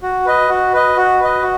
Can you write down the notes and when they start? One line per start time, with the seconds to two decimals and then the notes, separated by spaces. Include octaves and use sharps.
0.03 F#4
0.26 B4 D#5
0.49 F#4
0.74 B4 D#5
0.97 F#4
1.20 B4 D#5
1.42 F#4